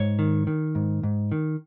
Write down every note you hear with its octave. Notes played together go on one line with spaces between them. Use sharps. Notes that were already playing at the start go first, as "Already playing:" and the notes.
Already playing: G#2 C#5
D#3
D#3
G#2
G#2
D#3